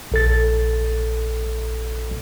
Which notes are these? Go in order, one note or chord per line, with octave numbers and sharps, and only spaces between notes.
A#1 A4 A6